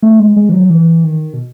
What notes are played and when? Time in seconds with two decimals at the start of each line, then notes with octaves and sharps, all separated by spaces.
0.03 A3
0.20 G#3
0.36 G#3
0.49 E3
0.53 F#3
0.70 E3
1.04 D#3
1.33 B2